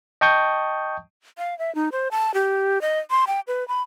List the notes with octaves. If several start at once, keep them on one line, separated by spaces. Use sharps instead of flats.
D#5 G5 A5 C#6 D#6 G6
F5
E5
D#4
C5
A5
G4
D#5
C6
G5
B4
B5